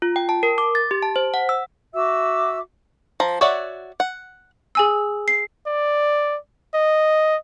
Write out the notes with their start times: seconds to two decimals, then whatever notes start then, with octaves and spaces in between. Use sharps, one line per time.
0.02 F4
0.16 G5
0.29 A5
0.43 A#4
0.58 D6
0.75 A6
0.91 G4
1.02 A5
1.16 C5
1.34 F#5
1.49 E6
1.94 F#4 E5 D6 E6
3.20 F3 A#5
3.41 F#4 C#5 D5 E5 F#5
4.00 F#5
4.75 G#4 G#5 E6
5.28 C7
5.67 D5
6.74 D#5